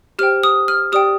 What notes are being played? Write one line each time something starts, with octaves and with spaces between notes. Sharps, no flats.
G4 C5 G5 F6
D#6
F6
G4 D5 G5 D#6